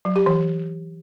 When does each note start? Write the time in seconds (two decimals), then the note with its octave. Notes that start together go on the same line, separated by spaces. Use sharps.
0.05 F#3
0.16 G4
0.26 E3